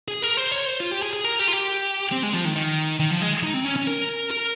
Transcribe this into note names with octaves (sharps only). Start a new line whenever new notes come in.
G#4
A#4
C5
C#5
C5
F4
G4
G#4
G#4
A#4
G4
F4
G4
C4
G#3
F3
D#3
D#3
D#3
F3
G#3
D#4
C4
C#4
C#4
A#4
A#4